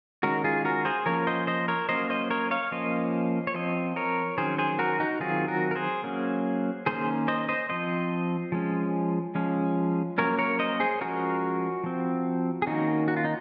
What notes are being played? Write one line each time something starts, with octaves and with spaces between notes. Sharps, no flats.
D#3 G#3 C#4 F#4 A#4
F4 G#4
F#4 A#4
G#4 C5
F3 A#3 C#4 A#4 C#5
C5 D#5
C5 D#5
A#4 C#5
F#3 A#3 C#4 C5 D#5
C5 D#5
A#4 C#5
C#5 F5
F3 A#3 C#4 C5 D#5
C#5
F3 C4 C5 D#5
A#4 C#5
D#3 F#3 C#4 G#4 C5
G#4 C5
F#4 A#4
D#4 F#4
D#3 F#3 C4 F4 G#4
F#4 A#4
A#4
G#4 C5
F#3 A#3 C#4
D#3 A#3 C#4 G#4 C5
C5 D#5
C5 D#5
F3 C4 C5 D#5
F3 G#3 C#4
F3 G#3 C#4
F#3 A#3 C#4 A#4 C#5
A#4 C#5
C5 D#5
G#4 C5
F3 G#3 C#4 F#4 A#4
F3 C4
G#4
D#3 A#3 C#4 D#4 F#4
F#4
F4
D#4